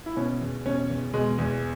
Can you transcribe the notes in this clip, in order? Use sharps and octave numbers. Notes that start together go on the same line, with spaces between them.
E4
B2 C#4
E2
B2 C#4
E2
B2 G#3
E2